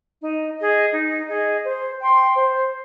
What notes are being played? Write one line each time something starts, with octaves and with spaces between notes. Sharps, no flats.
D#4
G#4 D#5
D#4
G#4 D#5
C5
G5 C6
C5